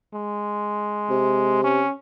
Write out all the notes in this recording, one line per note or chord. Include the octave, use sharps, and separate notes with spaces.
G#3
C3
C#4